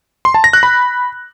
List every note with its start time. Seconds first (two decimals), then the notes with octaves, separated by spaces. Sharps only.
0.25 C6
0.34 A5
0.44 A#6
0.53 F#6
0.63 B5